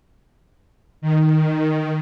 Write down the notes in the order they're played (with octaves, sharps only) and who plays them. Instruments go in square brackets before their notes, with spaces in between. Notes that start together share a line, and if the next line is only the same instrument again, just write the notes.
[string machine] D#3